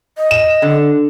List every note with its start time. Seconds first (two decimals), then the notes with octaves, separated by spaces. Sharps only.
0.17 D#5
0.31 E7
0.62 D3